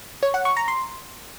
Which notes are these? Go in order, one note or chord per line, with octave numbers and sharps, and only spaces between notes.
C#5
F#5
C#6
A#5
C6